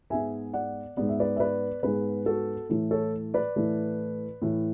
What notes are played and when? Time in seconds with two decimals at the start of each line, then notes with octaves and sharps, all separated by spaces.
0.10 G#2 G#3 B3 E5 G#5
0.54 D5 F#5
0.97 G#2 G#3 B3 D5
1.09 E5
1.20 B4 D5
1.36 E5
1.40 B4 D5
1.83 G#2 G#3 B3 G#4 B4
2.26 F#4 A4
2.70 A2 E3 A3
2.91 A4 C#5
3.34 B4 D5
3.56 A2 E3 A3
4.42 A2 E3 A3